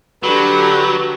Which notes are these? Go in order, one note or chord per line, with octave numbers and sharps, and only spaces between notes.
D3 F#3 G4 B4